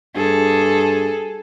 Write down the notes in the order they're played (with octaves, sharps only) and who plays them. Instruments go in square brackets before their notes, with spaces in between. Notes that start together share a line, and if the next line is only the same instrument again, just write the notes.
[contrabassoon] G2 [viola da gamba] G#4 A4